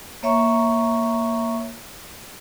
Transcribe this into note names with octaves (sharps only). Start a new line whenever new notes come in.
A#3 C#5 E5 A#5 C#6